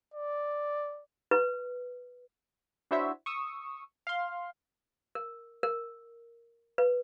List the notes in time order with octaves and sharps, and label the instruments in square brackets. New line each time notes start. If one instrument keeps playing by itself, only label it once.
[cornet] D5
[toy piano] B4
[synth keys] D4 E4 F#4 C5 C#5 E5
C#6 D#6 E6
F5 C6
[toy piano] A#4
A#4
B4